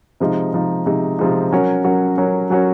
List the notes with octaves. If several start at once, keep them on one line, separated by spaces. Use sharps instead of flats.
C3 F3 G#3 D#4
C3 F3 G#3 D#4
C3 F3 G#3 D#4
C3 F3 G#3 D#4
F#3 C#4 F#4 A#4 C#5
F#3 C#4 F#4 A#4 C#5
F#3 C#4 F#4 A#4 C#5
F#3 C#4 F#4 A#4 C#5